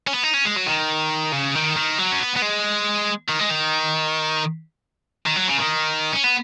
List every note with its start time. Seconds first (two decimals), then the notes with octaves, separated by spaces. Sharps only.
0.07 C#4
0.13 B3
0.24 D#4
0.34 C#4
0.45 G#3
0.57 F#3
0.67 D#3
1.32 C#3
1.55 D#3
1.77 D#3
1.99 F#3
2.12 C#4
2.20 B3
2.36 B3
2.42 G#3
3.29 D#3
3.40 G#3
3.51 D#3
5.26 D#3
5.36 F#3
5.47 C#3
5.58 D#3
6.12 C#4
6.24 B3